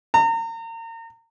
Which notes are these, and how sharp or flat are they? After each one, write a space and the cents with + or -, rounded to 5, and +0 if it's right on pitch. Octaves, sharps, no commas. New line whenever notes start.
A#5 -35